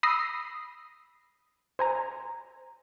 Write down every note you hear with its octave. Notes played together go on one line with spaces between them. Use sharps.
B5 D#6 E6 A#6 C7
C5 G#5 A#5